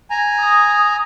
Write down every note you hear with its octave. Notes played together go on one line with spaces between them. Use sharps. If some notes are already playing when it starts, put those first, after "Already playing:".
G#5 A#5
D#6